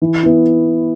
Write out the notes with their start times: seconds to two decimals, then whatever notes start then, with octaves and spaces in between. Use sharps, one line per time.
0.02 E3
0.23 B3 E4